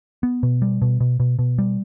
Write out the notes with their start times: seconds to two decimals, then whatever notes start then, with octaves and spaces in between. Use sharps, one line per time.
0.23 B3
0.43 B2
0.62 G3
0.82 B2
1.00 B2
1.20 B2
1.39 B2
1.58 G3